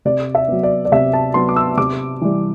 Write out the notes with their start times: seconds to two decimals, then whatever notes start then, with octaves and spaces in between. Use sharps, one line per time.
0.05 C3 D5
0.35 E5
0.48 F#3 B3
0.63 D5
0.85 D5
0.92 C3 E5
1.13 A5
1.34 F#3 B3 C6
1.49 D6
1.56 E6
1.77 C3 D6
2.21 E3 G3